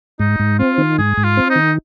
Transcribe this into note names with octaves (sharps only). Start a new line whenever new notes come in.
G#2 D#4
G#2
C4 F4
D#3
G#2 G#4
G#2
F4
C4
D#4
D#3